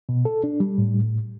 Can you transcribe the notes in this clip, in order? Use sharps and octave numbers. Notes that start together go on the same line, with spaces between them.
B2
A4
D4
G3
A2